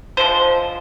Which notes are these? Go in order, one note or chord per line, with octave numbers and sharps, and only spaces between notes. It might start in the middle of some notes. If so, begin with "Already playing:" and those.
D3 F3 G#3 C5